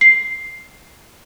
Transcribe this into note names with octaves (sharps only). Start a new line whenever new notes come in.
C7